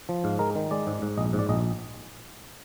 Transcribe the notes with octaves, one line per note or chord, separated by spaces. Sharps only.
F3
G#2 F5
G#3 A#4
D#3
G#3 D5
G#2
G#2
A#1 D#5
G#2
D5
A#1 D#5